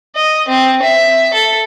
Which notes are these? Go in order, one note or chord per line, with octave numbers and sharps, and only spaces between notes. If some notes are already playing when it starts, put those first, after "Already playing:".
D#5
C4
E5
A4